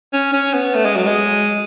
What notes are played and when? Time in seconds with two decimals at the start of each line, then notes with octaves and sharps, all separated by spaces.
0.13 C#4
0.33 C#4
0.54 B3
0.75 A3
0.85 G#3
0.96 F#3
1.06 G#3